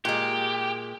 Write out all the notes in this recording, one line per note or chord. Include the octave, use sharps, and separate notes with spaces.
A#2 G#3 G4